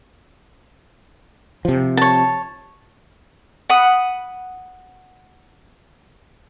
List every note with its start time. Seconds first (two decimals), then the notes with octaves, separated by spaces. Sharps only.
1.65 C3 F3
1.97 C#5 A5
3.70 F#5 B5 D#6